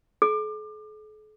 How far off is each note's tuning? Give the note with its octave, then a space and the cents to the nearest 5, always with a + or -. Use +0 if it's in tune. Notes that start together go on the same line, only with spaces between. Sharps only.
A4 -45 D6 +30